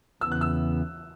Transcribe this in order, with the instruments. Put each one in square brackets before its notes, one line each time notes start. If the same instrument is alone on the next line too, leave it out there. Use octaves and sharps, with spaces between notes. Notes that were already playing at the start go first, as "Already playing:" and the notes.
[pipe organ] E2 C#3 E3 B3 [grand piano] E6
[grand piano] F#6
E6